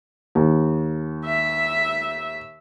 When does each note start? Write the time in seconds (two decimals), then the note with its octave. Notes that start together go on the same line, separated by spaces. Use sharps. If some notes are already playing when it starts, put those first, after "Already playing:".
0.35 D#2
1.26 E5